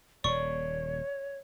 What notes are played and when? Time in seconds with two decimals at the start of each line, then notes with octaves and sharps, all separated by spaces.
0.24 D#1 A#2 C#5 D5 C#6